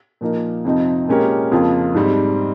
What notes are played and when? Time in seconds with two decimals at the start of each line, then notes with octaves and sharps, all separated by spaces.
0.21 A#2 F3 A#3 D#4 A#4
0.65 F2 C3 F3 C4 D#4
1.08 A#2 G#3 C#4 G4 A#4
1.52 F2 C#3 F3 A#3 F4
1.94 G#2 G3 C4